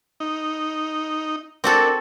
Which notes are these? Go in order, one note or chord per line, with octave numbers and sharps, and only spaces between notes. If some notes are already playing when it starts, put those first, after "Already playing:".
D#4
C4 D4 F#4 A4 A#4